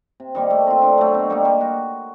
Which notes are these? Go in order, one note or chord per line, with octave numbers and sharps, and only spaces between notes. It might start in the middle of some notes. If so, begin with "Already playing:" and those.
C3
D#3 G3 A#3
A3
C4 F4
D3
F#3 A3
B2
G3 A#3 D#4
G3
F#4